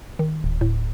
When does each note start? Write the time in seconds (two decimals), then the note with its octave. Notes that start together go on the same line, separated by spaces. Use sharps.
0.19 D#3
0.44 D1
0.61 A2